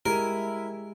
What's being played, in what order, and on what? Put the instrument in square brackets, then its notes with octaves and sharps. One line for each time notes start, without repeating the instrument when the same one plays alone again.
[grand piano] G#3 G#6 D#7 [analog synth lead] E4 [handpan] G4 [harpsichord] A#4